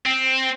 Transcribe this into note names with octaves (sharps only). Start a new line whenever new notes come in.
C4